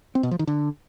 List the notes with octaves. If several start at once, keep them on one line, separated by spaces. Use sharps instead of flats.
C4
B2
F3
D#3
D3